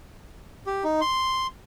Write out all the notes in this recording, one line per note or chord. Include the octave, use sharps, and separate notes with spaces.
G4
D#4
C6